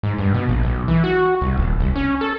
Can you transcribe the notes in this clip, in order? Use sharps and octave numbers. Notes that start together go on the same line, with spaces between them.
G#2
G2
B2
A#1
B1
E3
F#4
C2
D#1
C2
C#4
A4